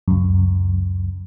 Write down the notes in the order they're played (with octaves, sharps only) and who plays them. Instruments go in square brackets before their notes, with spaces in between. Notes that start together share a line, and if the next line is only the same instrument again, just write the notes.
[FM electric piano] C#2 F#2